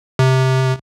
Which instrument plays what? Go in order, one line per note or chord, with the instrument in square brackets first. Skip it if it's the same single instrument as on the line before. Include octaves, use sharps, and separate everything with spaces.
[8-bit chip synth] C3